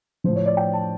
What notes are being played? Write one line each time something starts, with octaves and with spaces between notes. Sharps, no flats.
A2 F3 C5
C#5
D5
G5
A5